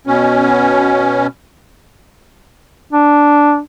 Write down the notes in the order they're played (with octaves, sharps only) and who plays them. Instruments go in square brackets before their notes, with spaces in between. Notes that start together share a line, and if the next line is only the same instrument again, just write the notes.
[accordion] B2 C#4
[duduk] D4